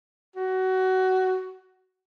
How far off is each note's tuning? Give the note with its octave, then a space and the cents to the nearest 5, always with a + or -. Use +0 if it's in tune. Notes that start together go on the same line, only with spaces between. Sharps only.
F#4 +20